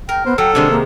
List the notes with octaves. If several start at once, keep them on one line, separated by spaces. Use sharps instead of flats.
A#4 G5
B3 C5
F#3 A4 G5
C3 D#3 G#3 D4
A#3